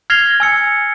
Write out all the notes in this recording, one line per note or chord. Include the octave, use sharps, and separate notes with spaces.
F6 G#6 A#6 C7 F7 G7
G#5 E6 C#7